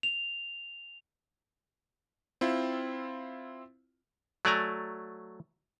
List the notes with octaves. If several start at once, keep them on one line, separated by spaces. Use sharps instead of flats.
F7
C4 E4 F4
F#3 A3 D5 G#5 A#5